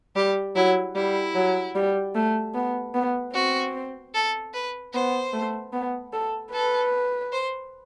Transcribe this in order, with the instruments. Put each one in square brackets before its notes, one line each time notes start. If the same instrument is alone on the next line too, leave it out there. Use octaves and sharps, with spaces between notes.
[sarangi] G3 [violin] G4
[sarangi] F#3 [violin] E4
[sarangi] G3 [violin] E4
[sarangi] F#3
G3
A3
B3
B3
[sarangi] C4 [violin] F#4
[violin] A4
B4
[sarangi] B3 [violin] C5
[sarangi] A3
B3
A4
[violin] A4 [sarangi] B4
[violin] C5